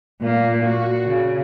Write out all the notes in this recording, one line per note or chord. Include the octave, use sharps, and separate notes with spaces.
A#2 A#3
F#4
C#3